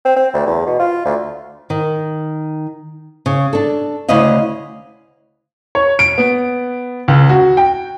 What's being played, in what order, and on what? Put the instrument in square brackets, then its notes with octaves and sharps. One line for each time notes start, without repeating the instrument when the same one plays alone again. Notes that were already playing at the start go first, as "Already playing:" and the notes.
[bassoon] C4
C4
D2
E2
B2
F4
D2
[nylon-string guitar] D#3
C#3
D4 A4
D2 C#3 E4 D#5 F5
[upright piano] C#5
D7
B3
C#2
F#4
G5